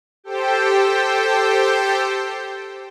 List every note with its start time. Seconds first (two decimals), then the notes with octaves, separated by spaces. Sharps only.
0.24 G4 A4 C5 G5